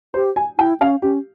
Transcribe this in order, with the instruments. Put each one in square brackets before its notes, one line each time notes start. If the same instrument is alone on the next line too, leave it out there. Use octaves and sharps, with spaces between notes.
[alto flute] G4 [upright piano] C5
[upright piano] G#5
[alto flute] E4 [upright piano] G5
[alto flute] C#4 [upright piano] F5
[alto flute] C#4 [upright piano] G4